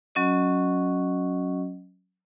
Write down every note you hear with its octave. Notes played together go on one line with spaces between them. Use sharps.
F#3 C#4 F#4 D#5